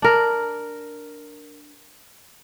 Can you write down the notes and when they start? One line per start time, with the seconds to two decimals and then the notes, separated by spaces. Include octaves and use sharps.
0.02 D4 A#4